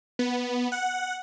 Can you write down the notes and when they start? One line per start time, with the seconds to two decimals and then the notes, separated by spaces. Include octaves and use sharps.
0.19 B3
0.72 F#5